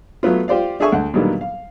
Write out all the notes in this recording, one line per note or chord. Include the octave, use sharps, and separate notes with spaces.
F#3 A3 B3 F4
F4 G4 C5 D5 F5
D4 G#4 A4 E5 G#5 C#6
D2 F#5
A#2 D3 D#3 F#3 G3 B3
F5